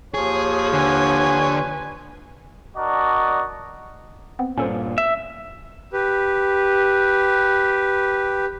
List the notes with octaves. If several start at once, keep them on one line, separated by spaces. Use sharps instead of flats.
D#2 F3 G#4 C#5
D3 B4 G#5
D4 F#4 A#4 D5 D#5
B3 C4
G2 A#2 C#4 A4 C5
E5
G4 B4